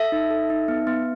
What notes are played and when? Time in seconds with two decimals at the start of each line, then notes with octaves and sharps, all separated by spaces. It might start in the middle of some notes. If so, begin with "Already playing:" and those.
Already playing: A4 E5
0.12 D#4
0.31 A4
0.50 D#4
0.68 B3
0.87 B3